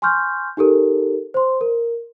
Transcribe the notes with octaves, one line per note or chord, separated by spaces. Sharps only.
G#5 C6 C#6 F6 G6
D#4 G4 A4 A#4
C5 C6
A#4